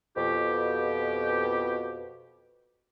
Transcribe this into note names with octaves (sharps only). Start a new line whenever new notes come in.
F2 B2 G4